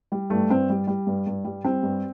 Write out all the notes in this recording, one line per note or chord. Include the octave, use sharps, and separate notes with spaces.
G3
G2 A3
G2 C4
G3
G3
G2
G2
G3
G3 C4
G2